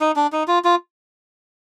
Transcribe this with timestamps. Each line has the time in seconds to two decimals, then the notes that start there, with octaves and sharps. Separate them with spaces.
0.01 D#4
0.16 D4
0.32 D#4
0.48 F4
0.64 F4